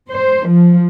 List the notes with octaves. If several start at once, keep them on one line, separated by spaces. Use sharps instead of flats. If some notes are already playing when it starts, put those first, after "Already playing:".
C5
F3